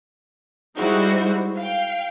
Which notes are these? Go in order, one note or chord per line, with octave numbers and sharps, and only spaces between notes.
G3 G#3 D#4 E4 F#4 C5
F5 G5